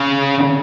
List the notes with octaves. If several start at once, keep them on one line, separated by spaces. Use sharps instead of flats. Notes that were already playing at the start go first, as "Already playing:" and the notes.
Already playing: C#3